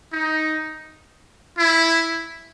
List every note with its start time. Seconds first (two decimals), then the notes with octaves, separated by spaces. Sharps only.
0.12 D#4
1.58 E4